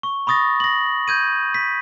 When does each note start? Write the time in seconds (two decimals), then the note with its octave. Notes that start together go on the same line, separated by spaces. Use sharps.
0.03 C#6
0.27 B5 C#6 D#6 A6 A#6
0.60 A#6 F#7
1.08 G6 G#6 D#7
1.54 B6